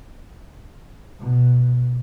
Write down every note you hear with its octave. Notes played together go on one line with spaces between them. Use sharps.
B2